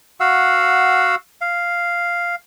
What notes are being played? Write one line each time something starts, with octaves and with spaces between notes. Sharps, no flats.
F#4 F5 F#5 E6
F5